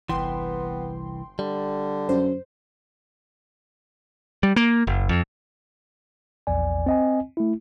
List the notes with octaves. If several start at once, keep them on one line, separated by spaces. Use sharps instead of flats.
G1 C2 E3 B3 G5 C6
D3 G3
F#2 C5
G3
A#3
F#1
F2
A#1 E2 D5 G#5
C4 D#5 G#5
A3 E4